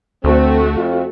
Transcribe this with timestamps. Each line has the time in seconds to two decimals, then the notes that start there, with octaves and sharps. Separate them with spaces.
0.24 D2 A3 C4 F#4
0.75 F2 C4 F4